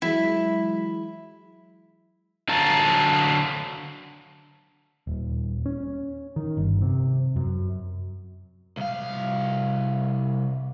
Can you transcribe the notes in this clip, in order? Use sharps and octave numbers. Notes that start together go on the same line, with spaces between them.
E3 F#3 G#3 E4
D3 F#3 F5 A5 A#5
D#1
C#4
D#3
G1
C3
F#2
C2 F5